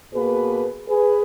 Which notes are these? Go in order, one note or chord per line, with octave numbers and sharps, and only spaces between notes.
B2 A#3 G#4 B4
G#4 B4